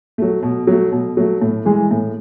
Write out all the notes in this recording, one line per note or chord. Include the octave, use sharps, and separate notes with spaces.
F#3 A3
B2
F#3 A3
B2
F#3 A3
A2
E3 G#3
A2